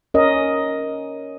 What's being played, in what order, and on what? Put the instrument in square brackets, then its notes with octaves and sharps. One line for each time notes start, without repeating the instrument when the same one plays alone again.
[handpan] C#4 A#4 D#5